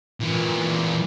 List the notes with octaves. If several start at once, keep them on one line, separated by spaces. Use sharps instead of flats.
A#2 E3